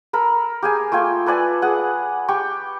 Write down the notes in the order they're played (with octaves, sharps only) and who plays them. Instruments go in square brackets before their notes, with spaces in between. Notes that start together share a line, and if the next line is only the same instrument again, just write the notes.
[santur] A4 A#4 B5
G4 G#4 G#5
A3 F4 G5 G#5
A4 B4 D5 G#5
G#4 F#5
G4 G5 C#6